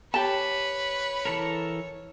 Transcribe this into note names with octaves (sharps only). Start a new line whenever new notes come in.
G4 B4 C#5 A5
E3 A4 A#4